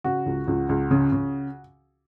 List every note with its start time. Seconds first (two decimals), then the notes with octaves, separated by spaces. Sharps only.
0.04 C#3 F#4
0.26 C#2
0.48 C#2
0.69 C#2
0.91 C#3
1.12 C#3